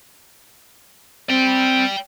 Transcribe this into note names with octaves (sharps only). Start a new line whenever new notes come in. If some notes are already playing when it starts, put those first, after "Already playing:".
C4 D5 G5